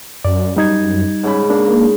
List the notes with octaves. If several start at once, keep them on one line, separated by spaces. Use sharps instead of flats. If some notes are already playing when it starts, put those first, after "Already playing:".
F#2 D5
G3 D#4 G#6
G#2 C#3 B5
A#3 D4